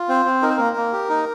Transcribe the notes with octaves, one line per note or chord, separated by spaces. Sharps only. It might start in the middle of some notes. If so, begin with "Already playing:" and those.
Already playing: F4
C4 C5
C4
D#4 A#4
C5
A#3 A#4
A#3
G4
D#4